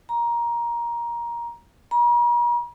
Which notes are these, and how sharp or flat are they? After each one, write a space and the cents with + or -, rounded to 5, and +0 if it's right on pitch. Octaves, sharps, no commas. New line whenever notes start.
A#5 +15
A#5 +45